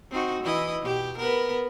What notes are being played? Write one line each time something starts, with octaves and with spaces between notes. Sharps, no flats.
C4 D#4 F#4
E3 E4 D#5
B2 G4
B3 A#4 B4